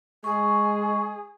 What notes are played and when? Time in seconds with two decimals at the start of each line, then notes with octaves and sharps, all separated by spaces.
0.24 G#3 G#4 C#6